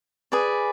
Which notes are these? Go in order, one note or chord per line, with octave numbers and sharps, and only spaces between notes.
G#4 B4 D5